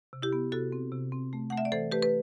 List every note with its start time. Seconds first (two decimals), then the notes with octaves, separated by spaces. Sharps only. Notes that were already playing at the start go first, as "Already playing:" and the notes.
0.13 C3
0.22 E4 G4
0.33 B3
0.52 C3 F#4 A4
0.72 C4
0.92 C3
1.12 C4
1.33 A3
1.50 A3 F#5
1.57 E5
1.65 D5
1.72 E3 A4 C5
1.92 A3 G4 B4
2.02 B4